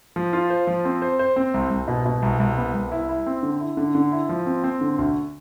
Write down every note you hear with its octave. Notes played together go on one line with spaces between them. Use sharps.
F3
F4
C5
F3
C4
C5
C5
C4
C2
C2
B2
B2
C2
C2
B3
C2
E4
E4
C4
D3
E4
D3
D3
E4
F3
C4
C4
D3
D2